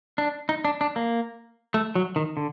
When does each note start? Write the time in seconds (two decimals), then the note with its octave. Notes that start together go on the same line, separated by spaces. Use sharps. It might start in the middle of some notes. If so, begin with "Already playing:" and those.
0.18 D4
0.49 D#4
0.65 D4
0.81 D4
0.96 A#3
1.74 A3
1.95 F#3
2.16 D#3
2.37 D3